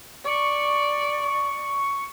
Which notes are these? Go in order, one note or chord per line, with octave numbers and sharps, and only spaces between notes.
D5 C#6